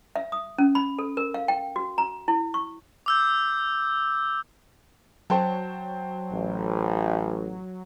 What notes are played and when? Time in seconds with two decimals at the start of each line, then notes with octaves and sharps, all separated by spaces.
0.16 E5
0.32 D#6
0.58 C#4
0.75 B5
0.99 A4
1.17 A#4
1.34 F5
1.48 G5
1.76 F#4
1.98 A#5
2.28 E4
2.54 C#6
3.06 D6 E6 G6
5.30 F#3 C5 G5 A5
6.31 A1